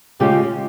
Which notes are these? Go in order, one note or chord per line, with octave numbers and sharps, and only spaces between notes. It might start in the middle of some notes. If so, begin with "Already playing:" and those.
C#3 G#3 C#4 F4 G4